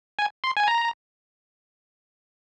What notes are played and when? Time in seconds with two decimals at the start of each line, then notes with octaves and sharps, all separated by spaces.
0.19 G#5
0.44 C6
0.57 G#5
0.68 A#5